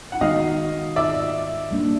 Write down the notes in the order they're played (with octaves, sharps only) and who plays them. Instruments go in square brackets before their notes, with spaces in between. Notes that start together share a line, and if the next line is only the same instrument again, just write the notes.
[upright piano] F#5
[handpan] D#3 G#3 B3 D#4 F#4 [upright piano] D#5 F5
[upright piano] D5 E5
[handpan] G3 A#3 D4